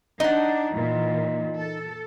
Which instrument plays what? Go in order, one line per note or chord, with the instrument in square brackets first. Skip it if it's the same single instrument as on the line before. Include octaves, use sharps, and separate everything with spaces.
[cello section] D4 [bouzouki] D#4 F#5
[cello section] A#2 E3
A4